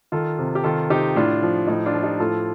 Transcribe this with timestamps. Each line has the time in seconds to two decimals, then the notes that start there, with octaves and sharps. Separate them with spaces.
0.12 D#3 F4 A4
0.39 C3
0.55 G4
0.64 D#3 F4 A4
0.90 C3 D#4 G4
1.16 A2 D4 F4
1.43 F3
1.67 A2 D#4
1.86 D4 F4
1.95 F3
2.03 D#4 G4
2.20 A2 F4 A4